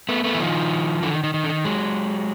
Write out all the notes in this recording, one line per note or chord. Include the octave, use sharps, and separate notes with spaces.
A3 B3
A3 B3
E3
D#3 F3
D3 E3
D#3
D#3
D#3
D3
D#3
F#3 G#3